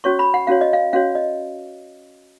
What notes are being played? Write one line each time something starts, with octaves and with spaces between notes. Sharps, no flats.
C#4 F#4 C#5 C#6
B5
F#5
C#4 F#4 C#5 F5
D#5
F5
C#4 F#4 C#5 F5
D#5